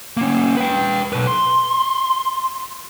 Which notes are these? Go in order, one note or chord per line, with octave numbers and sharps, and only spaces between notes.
A#3 C#4
B4 G5
B1 B4
C6